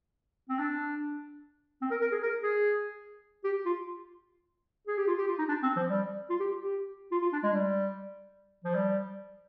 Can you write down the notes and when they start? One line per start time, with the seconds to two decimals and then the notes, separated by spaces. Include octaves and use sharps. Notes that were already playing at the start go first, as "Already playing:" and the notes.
0.49 C4
0.59 D4
1.82 C4
1.91 A#4
2.01 A#4
2.12 G#4
2.23 A#4
2.43 G#4
3.44 G4
3.66 F4
4.87 G#4
4.98 G4
5.07 F4
5.18 G4
5.28 F4
5.39 D#4
5.49 D4
5.63 C4
5.76 F3
5.89 G3
6.30 F4
6.40 G4
6.61 G4
7.12 F4
7.22 F4
7.33 D4
7.43 G#3
7.53 G3
8.64 F3
8.75 G3